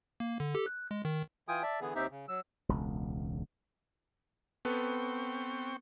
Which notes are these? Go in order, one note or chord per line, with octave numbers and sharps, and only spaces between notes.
A#3
D3
G4 A4
F#6
G#3
D#3
E3 F4 G5 G#5 D#6
D5 E5 A5
D3 E3 B3 G#4
D#2 C4 D#4 G4 E5
C#3
F#3 E6
E1 C#2
B3 C4 A4 B4 G5 C#6